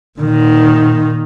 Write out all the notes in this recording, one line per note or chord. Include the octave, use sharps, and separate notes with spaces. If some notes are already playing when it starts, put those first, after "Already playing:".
A#2 D#3